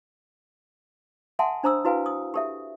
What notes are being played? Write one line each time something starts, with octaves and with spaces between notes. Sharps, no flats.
A4 E5 F#5 G#5 A5 C6
D4 C5 A#5 D#6 E6
E4 F#4 B4 F5 G#5
D#6
G4 A4 E5